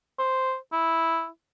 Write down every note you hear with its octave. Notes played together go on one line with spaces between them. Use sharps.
C5
E4